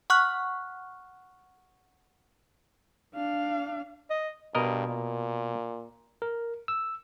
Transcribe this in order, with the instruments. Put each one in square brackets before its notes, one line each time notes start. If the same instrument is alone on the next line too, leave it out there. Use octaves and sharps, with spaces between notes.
[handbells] F#5 C#6 F6 F#6
[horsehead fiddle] D4 F5
[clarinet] D#5
[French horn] G2 [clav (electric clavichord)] B2 A#4 D#5
[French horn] A#2
[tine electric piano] A#4
E6